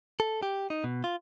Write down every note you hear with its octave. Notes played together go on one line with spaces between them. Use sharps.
A4
G4
D#4
B2
F4